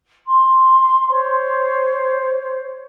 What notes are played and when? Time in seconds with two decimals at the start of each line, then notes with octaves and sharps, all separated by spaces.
0.25 C6
1.08 C5 C#5